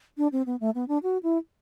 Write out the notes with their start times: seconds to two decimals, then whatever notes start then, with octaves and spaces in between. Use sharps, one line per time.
0.18 D4
0.32 C4
0.46 B3
0.60 A3
0.75 B3
0.88 D4
1.03 F#4
1.23 E4